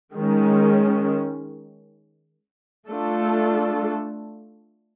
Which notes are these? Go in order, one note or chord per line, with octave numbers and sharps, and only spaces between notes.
D#3 G#3 C#4
A3 D4 F4 A4